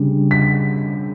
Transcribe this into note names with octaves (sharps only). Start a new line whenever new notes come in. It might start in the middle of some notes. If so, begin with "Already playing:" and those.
Already playing: C#3 G3 D4
B6